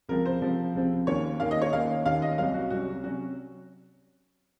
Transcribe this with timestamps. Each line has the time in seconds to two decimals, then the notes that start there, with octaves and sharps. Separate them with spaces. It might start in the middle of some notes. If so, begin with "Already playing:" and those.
0.09 C#2 C3 F3 C4 A#4
0.25 C5
0.41 C#2 C3 F3 C4
0.75 C#2 C3 F3 C4
1.07 D#2 D#3 A#3 C#4 C#5
1.40 D#2 D#3 A#3 C#4 F5
1.51 D#5
1.62 C#5
1.72 D#2 D#3 A#3 C#4 F5
2.06 D#2 D#3 A#3 C#4 F5
2.22 D#5
2.38 C2 C3 F#3 C#4 F5
2.54 F#4
2.70 C2 C3 F#3 C#4 F#4
3.04 C3 F#3 C#4 F#4